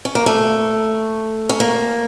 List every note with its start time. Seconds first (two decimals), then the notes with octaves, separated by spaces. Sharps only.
0.05 C#4
0.15 A#3
0.26 A3
1.49 C#4
1.60 A#3